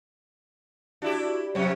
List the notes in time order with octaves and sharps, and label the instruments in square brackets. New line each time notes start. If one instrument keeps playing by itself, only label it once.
[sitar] D4 E4 G4 [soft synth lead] F#4
[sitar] F2 C3 C#4 [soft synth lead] F#3